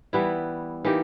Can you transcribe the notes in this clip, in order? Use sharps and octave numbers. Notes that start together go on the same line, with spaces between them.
E3 G3 B3 E4
E3 A#3 D#4 G4